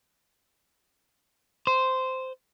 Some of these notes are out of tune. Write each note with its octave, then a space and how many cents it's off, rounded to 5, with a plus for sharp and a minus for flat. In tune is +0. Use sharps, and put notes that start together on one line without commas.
C5 -10